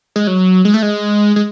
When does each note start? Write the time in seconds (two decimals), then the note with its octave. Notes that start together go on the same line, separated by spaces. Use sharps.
0.16 G#3
0.27 F#3
0.65 G#3
0.74 A3
0.82 G#3
1.36 G#3